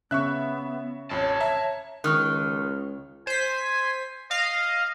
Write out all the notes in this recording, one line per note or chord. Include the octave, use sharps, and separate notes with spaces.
C#3 B3 E5 C#6 F#6
A1 F2 C#5 A5
E5 A#5
C#2 D#3 C#6 F6 F#6
C5 G#5 B6
D#5 F5